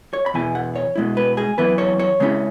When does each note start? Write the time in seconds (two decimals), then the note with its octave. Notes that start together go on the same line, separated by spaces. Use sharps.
0.13 C#5
0.26 B5
0.34 E2 B2 B3 E4 G#5
0.55 F#5
0.76 C#5
0.96 B2 G#3 E4
1.17 B4
1.37 G#4
1.58 F#2 E3 B3 E4 B4
1.78 C#5
1.99 C#5
2.20 C#3 G#3 C#4 E4